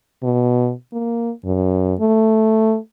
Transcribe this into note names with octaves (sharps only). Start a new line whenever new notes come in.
B2
A#3
F#2
A3